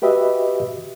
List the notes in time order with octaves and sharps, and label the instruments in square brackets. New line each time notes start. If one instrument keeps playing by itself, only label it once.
[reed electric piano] F#4 G4 B4 D#5 E5